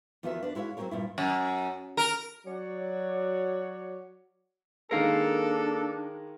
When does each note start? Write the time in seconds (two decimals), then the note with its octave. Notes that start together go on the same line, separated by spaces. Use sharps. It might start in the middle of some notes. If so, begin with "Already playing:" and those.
0.23 E2 F3 B3 F#4 A#4 E5
0.43 D4 B4
0.55 G#3 E4 F#4 C#5 F5
0.77 F#3 C4 C#4 G4 A#4 C#5
0.91 G2 A#2 E4
1.18 F#2
1.97 A#4
2.47 F#3 F#4 C#5 D5
4.91 D#3 G#3 A#3 D4 A4 A#4 F5